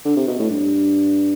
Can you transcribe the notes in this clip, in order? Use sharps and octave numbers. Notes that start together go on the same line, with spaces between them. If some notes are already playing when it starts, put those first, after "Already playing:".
D3
C3
B2
A2
G2